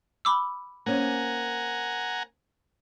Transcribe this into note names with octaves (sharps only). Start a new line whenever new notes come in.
B5 D6 E6
A#3 C4 C#4 F#5 G#5 A#5